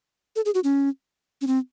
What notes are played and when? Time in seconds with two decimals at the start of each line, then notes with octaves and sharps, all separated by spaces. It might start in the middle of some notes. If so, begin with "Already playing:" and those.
0.36 A4
0.45 G#4
0.55 F#4
0.64 C#4
1.41 C#4
1.47 C4